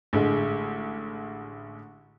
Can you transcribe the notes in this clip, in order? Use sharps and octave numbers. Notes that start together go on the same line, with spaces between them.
A1 D3 G#3